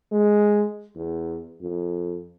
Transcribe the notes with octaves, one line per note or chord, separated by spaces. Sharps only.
G#3
E2
F2